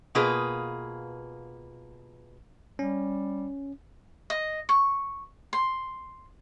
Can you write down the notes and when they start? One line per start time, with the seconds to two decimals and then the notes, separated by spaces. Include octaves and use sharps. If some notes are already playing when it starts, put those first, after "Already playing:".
0.15 B2 A#3 F4 G#4 B4
2.79 G3 C#4
4.30 D#5
4.69 C#6
5.53 C6